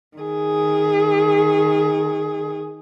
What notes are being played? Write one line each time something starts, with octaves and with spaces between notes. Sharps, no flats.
D#3 G#4